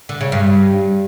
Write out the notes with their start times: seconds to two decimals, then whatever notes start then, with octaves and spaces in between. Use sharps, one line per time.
0.09 D3
0.21 C#3
0.32 G2